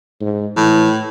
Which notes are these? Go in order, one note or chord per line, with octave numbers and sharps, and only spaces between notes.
G#2
A2 E3